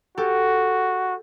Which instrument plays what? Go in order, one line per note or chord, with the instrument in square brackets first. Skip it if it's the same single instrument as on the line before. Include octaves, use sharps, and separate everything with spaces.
[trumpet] F#4 [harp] G4 A4